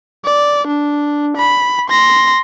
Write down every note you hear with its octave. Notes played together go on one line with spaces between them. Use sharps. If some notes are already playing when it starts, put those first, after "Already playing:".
D5
D4
B5
C6 A#6